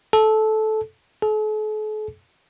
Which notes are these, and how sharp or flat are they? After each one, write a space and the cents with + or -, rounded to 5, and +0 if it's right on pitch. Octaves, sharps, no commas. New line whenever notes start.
A4 -15
A4 -45